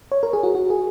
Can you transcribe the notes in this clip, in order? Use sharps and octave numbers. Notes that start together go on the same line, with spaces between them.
C#5
A#4
G#4
F#4
F#4
G#4